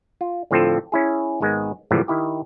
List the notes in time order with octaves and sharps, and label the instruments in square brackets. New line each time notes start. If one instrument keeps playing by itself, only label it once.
[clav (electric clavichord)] F4
A2 D3 F3 C4 F4 A4
C#4 E4 G#4
G#1 D#3 G#3 B3
G#1 A2 C3 E3 F3 G3
D#3 E4 G4